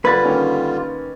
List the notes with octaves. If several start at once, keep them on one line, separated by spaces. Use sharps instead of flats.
D3 G3 F4 B4 G#6 A6
D#3 A#3 C#4